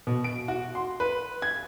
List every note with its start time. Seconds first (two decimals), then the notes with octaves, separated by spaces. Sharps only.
0.07 B2
0.24 D7
0.48 F#4
0.75 C6
1.00 B4
1.42 G#6